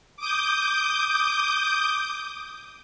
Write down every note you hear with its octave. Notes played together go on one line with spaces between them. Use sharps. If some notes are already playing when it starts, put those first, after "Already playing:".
D6 D#6 G6